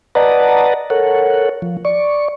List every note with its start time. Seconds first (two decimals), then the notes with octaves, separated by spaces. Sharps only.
0.15 B4 D5 D#5 F#5 A5 A#5
0.90 A4 A#4 C#5 F#5
1.62 F3
1.85 D5 C#6